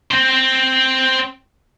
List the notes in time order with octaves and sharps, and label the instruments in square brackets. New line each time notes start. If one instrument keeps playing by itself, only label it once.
[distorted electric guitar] C4 C5